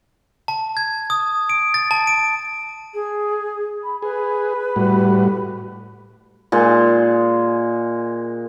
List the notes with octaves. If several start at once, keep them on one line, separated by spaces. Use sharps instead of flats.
A5
G#6
D#6
D7
A6
A5
D7
G#4
B5
G#4 B4
A2 G3 F#4
A#2 G#3